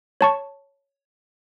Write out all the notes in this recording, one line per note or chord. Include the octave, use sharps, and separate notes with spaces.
C#5 A5 C#6